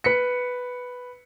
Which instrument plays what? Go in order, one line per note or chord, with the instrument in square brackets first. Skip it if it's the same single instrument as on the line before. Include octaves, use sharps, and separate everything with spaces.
[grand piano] B4 B6 C#7